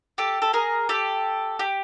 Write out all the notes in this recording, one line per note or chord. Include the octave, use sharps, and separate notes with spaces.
G4 A4
A4
G#4 A#4
G4 A4
G4